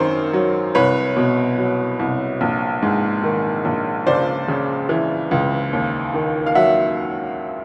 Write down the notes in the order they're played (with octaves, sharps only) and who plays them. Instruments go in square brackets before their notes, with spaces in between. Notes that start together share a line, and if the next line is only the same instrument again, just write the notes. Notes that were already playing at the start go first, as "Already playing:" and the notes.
Already playing: [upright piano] G#1 F#2 D#3 A#4 C5
F#3
C2 B4 C#5
B2
F#3
C2
A#1
G#2
D#3
A#1
C#2 C5 D5
C#3
E3
C#2
D#2
D#3
F5
F#3 E5 F#5